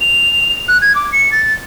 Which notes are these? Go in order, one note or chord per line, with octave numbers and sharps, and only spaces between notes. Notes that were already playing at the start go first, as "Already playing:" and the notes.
F7
F#6
G#6
D6
C#7
A6